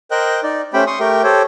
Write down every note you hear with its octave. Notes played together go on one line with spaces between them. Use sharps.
A#4 C5 D#5 G5 F#6
D#4 D5
A3 C#4 G4 C5 G5 B5
C6 C#6 D#6
A3 G4 A#4 G5
G4 A4 C5 C#5